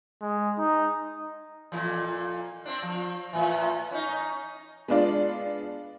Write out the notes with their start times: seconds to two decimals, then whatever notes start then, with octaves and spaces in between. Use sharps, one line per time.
0.22 G#3
0.58 D#4
1.72 F2 A#2 E3
2.65 C4 D4
2.83 F3
3.33 A2 E3
3.91 C#4 D#4
4.88 G#3 B3 D4 F4 D5